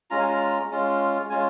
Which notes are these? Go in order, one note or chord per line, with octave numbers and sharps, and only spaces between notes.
G#3 C#4 F4 A#5
G#5
A#5
G#3 C#4 F4
G#3 C#4 F4 G#5